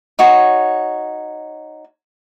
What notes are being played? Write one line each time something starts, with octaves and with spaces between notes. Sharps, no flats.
D#4 F#4 C#5